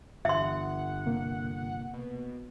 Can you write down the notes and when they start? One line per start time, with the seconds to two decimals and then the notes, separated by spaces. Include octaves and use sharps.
0.25 G1 E5 F#5 C6
1.06 C3 A#3
1.93 B2